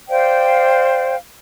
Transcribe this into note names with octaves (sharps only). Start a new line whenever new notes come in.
C5 D5 F5 G5